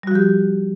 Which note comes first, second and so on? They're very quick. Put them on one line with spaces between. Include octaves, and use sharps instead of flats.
G3 F#4 F3 G4